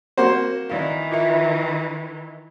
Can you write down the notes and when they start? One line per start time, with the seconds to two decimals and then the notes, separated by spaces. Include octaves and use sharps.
0.17 A#3 C4 F#4 C5
0.70 D#3 E3 D5 F5
1.12 F4 A#4 E5